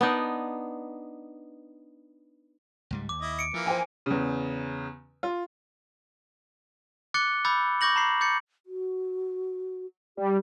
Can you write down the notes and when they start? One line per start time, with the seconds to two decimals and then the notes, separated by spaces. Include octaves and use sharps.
0.01 B3 D4 D#4 D5
2.91 C#2 G#2 G3
3.09 D#2 D6
3.21 E4 D#5
3.39 C#7 D7
3.54 E3 F3 A#3
3.66 C5 G5 G#5
4.06 E2 C#3
5.23 F4
7.14 D6 F#6 A6 C#7 G7
7.45 B5 D6 E6 G6 A6
7.81 C#6 D6 G6 A#6 F#7
7.96 A#5 B5 C7
8.21 D6 G6 A6 C#7
8.66 F#4
10.17 G3 G4